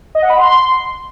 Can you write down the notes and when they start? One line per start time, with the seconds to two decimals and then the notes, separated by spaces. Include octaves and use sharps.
0.15 D#5
0.22 F#5
0.30 B5
0.37 C6